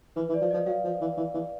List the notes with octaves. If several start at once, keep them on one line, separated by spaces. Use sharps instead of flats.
E3 B4
E3
D5
F3
D#5
F3
F#3 F5
F3
E3
E3
E3